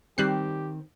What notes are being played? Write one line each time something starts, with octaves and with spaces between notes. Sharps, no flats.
D#3 G3 C4 G4 F#6 C7